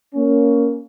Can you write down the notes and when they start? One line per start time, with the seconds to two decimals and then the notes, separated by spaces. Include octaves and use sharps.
0.14 A#3 C#4